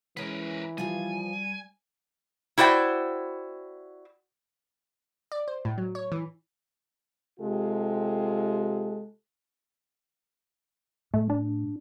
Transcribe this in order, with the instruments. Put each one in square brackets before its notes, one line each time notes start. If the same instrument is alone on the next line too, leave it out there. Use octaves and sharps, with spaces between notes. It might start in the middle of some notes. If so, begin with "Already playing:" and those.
[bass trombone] E3 [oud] G#3 C#4 [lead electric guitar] A#4 B4
[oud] F3 F4 G#4 [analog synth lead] G3 [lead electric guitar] G#5
[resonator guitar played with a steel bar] E4 F#4 C5 D5 G5
[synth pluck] D5
C5
A2
F#3
C#5
E3
[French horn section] C3 G#3 F4 G4 A4
[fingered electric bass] A2 [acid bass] A3
[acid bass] D4